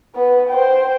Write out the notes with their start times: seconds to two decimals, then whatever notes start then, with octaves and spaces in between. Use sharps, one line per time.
0.15 B3 B4
0.49 C5 G5